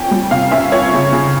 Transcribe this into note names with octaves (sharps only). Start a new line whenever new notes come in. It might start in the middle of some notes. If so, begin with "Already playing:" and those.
Already playing: F2 C#4 G5
G3
C3 F5
C#4 E5
F2 C#5
C#3
C#3